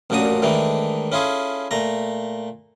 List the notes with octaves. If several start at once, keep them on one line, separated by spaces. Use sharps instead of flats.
A1 F#2 A#2 D4 F#4 D#6
G#2 D#3 E3 A3 D4
C#4 E4 F4 G#4 A4
A#2 A3 A#5